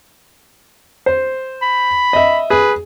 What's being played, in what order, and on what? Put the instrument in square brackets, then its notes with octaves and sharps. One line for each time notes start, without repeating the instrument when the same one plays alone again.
[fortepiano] C5
[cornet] B5
[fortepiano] D#5 E5
[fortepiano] G#4 [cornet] B4